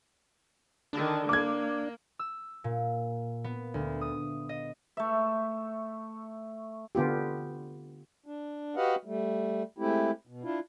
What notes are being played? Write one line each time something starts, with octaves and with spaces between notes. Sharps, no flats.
D3 D#3 D4
A#3 D6 G#6
E6
A#2
B3
D2
D#6
D#5
A3 E5
D3 B3 F4 G4
D4
F#4 G4 B4 D#5 F5 F#5
G3 A3
G#3 A3 C4 E4 G4
B2
D4 E4 F4